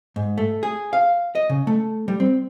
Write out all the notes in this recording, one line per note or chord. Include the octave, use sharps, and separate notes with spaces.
G#2
A3
G#4
F5
D#5
C#3
A3
G3
C4